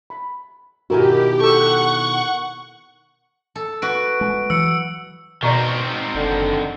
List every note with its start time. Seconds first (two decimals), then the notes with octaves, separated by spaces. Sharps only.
0.10 B5
0.90 B2 D#3 E4 F#4 G4 A#4 G#5
1.41 A4 F#5 C#6 E6
3.55 A4
3.82 F#4 B4 D7
4.21 G#3
4.50 E3 F#3 E6 C#7
5.43 B2 D#3 C4 D5 A#5 C#6
6.15 F#1 D3